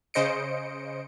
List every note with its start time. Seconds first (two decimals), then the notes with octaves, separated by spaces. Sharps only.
0.14 C#3 C5 D#5 C#7 D7